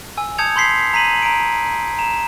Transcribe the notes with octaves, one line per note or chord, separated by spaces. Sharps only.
G#5 E6
A5 D#6 G6 G#6 C#7 F7
B5 C6 G6 B6 C7
A#5 B6 D#7 F#7
A#5 D7
A#5 E7